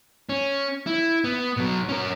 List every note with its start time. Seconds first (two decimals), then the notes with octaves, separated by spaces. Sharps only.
0.29 C#4
0.87 E4
1.24 B3
1.57 B2 F#3
1.89 C#4 A#4